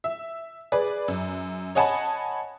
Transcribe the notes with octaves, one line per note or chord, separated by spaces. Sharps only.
E5
G#4 B4 D5
F#2
C#5 D#5 F#5 G#5 A5 B5